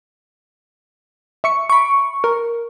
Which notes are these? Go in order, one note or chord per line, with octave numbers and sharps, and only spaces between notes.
E5 C#6 C#7
B5 C#6 D7
A#4